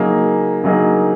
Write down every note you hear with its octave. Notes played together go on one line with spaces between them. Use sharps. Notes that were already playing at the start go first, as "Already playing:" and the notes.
Already playing: C#3 F#3 A#3 D#4 G#4
C#3 F#3 A#3 D#4 G#4